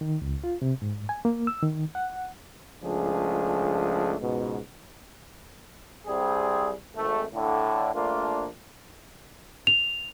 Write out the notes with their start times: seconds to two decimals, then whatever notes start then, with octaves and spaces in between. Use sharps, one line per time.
0.01 D#3
0.22 C#2
0.44 F4
0.62 C3
0.82 G#2
1.09 G#5
1.25 A#3
1.47 E6
1.63 D#3
1.95 F#5
2.84 C#2 F3 A3 D4 G#4
4.21 C#2 G#2 B2
6.07 C2 G3 C4 G#4
6.96 G#1 A3
7.33 A2 D3
7.94 A#1 A3 A#3 D4 F4
9.67 F7